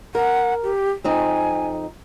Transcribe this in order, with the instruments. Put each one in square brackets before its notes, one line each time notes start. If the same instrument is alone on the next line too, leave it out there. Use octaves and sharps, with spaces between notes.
[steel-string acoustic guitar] A#4 [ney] F#5
[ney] G4
[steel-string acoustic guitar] F2 C4 D#4 [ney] G#5